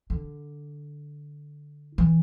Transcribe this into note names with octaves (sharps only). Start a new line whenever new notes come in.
D3
E3